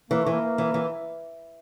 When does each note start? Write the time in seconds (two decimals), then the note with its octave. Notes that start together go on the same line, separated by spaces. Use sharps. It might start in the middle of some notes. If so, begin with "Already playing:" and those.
0.11 E3 A#3
0.23 E3 A3
0.34 A#3
0.58 E3
0.74 E3